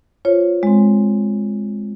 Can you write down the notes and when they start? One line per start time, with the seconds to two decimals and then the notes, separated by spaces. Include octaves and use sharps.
0.25 F4 C5 C#5
0.63 G#3 C4